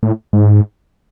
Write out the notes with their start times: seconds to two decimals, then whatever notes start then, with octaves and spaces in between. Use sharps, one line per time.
0.03 A2
0.33 G#2